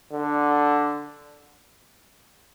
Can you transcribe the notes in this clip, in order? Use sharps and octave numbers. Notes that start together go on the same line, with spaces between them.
D3